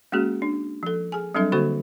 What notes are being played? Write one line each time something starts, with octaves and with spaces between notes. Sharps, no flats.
G#3 A#3 C#4 F#4 G#4
D4
F3 A4
G#4 G#5
F#3 G3 C4 D4 A4 E5
D3 A#3 F#4 A4 C5 C#6